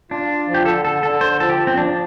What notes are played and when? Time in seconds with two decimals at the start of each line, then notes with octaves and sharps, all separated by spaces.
0.11 D4 F4
0.29 F4
0.48 F3
0.54 G4
0.66 D3 A4
0.84 D3 A4
1.03 D3 A4
1.21 D3 C5
1.40 F3 A4
1.49 G4
1.59 F3
1.67 C4
1.77 F3 D4